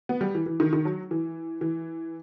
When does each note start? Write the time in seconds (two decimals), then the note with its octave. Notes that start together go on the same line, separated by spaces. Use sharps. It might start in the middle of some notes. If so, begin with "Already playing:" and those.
0.09 B3
0.21 G3
0.35 E3
0.46 E3
0.60 D#3
0.73 D#3
0.85 F#3
1.11 E3
1.61 E3